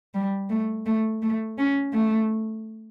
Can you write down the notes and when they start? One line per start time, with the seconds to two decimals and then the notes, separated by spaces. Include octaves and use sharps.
0.14 G3
0.50 A3
0.86 A3
1.22 A3
1.58 C#4
1.93 A3